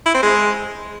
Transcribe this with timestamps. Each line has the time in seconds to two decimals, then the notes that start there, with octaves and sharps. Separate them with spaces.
0.06 E4
0.15 C4
0.23 G#3